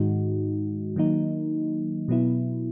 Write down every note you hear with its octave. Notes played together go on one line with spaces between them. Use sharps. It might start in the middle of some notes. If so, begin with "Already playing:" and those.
Already playing: G#2 D#3 G#3 D#4 F#4
D#3 F#3 A#3 D#4
B2 F#3 B3 E4